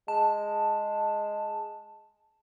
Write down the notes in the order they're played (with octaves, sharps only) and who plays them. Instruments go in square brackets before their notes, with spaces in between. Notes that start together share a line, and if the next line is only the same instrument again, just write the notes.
[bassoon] G#3 [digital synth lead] A5